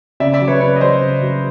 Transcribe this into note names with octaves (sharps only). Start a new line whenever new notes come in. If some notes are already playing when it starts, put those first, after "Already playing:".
C#3 D5 E5
D5 E5
F#3
B4 C#5
C#3 B4 C#5
D#5
F#3 C5 D5
C#3
F#3